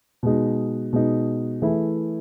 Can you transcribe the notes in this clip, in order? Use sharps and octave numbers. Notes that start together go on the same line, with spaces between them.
B2 G#3 D#4
B2 G#3 D#4
E3 A3 E4 G#4